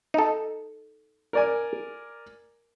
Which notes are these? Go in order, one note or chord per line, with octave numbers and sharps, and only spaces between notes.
D#4 A4
A#4 D5 G#5